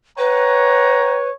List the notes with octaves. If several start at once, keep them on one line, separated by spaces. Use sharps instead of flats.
B4 C#5 F#5 G5 A#5